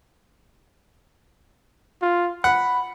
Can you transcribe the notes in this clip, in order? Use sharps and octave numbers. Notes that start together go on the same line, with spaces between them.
F4
F#5 B5